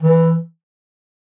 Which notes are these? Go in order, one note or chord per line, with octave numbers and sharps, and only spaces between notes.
E3